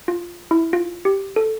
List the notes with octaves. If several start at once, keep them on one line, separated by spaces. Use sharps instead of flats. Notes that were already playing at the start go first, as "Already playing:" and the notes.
F4
E4
F4
G4
A4